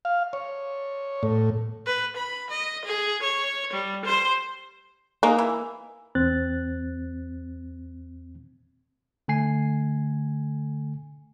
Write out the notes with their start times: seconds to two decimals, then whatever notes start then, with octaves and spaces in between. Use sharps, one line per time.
0.05 F5
0.33 C#5
1.23 A2
1.86 B4
2.17 B5
2.50 D#5
2.85 G#4
3.23 C#5
3.73 G3
4.05 C5
5.23 G#3 A#3 D#4
5.39 E3
6.15 E2 C4 F#6 A6
9.28 D3 A3 G#5 C7